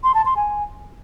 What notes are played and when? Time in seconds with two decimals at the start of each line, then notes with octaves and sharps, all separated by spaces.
0.04 C6
0.14 A5
0.25 C6
0.36 G#5